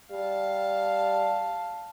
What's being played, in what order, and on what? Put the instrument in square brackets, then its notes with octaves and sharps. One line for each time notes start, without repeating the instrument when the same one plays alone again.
[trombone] G3 [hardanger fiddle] F5 A5